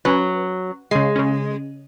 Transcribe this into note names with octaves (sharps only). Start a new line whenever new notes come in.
F#3 C#4 B4
C#3 G#3 C7
C#3 C#4